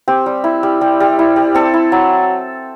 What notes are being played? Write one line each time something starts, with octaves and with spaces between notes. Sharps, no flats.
C4 G4
G3
E4
G3
G3
G3
E4
G3
C4 A4
E4
F#3